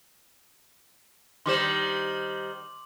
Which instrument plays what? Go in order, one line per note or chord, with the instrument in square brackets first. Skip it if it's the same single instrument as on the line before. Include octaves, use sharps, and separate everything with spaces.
[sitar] D#3 G3 C5 [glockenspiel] C6 D6 F#7